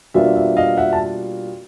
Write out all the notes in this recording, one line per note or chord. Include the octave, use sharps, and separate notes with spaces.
B2 G3 A#3 D4 F4 E5
E5
D#5 F5
E5 F#5
A5